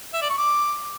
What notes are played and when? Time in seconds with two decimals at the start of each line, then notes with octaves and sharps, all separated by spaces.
0.14 E5
0.22 D5
0.30 C#6
0.38 D6